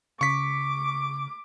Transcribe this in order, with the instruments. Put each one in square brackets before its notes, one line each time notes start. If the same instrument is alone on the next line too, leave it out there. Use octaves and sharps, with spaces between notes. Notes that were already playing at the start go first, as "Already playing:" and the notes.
[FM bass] C#3 [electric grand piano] C#6 B6 [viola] D6